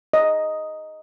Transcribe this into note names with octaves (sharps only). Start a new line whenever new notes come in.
D#5